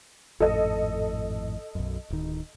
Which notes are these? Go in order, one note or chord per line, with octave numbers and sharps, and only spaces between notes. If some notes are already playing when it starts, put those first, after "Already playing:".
G#1 F2 A2 A4 D#5
B1 F#2
D1 D#3